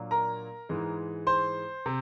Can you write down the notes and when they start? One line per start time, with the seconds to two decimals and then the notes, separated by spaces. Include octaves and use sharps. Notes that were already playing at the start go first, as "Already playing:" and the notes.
Already playing: A#2 F#3 A#3 D4
0.11 A#4 A#5
0.69 G#2 E3 G#3
1.27 C5 C6
1.86 C3